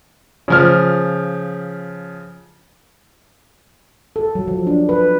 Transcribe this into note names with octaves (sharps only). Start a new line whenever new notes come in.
C#3 F3 F6
A4
F#3
F3
D4
B4